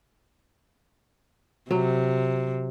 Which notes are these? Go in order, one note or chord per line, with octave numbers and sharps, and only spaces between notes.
C3 F#3